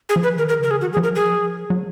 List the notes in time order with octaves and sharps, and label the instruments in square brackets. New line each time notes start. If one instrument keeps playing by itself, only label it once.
[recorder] G#4
[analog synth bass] F3
[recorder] B4
[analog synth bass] D#3 [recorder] A#4
[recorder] A#4
[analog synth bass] C#3 [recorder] A#4
[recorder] G#4
[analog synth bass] D#3 [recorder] F#4
[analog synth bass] F#3 [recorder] G#4
[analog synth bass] F3
[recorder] A#4
[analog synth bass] F#3 [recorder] G#4
[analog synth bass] F3
F#3